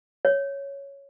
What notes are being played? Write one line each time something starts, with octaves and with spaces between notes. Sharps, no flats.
C#5